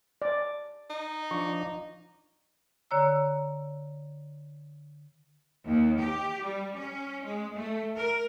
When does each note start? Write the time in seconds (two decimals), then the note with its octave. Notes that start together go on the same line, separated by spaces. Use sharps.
0.22 D5
0.90 D#4
1.31 F3 D4 C#6
2.91 D3 C#5 A#5 E6
5.65 D#2
5.99 G4
6.42 G3
6.76 C#4
7.24 G#3
7.56 A3
7.96 A#4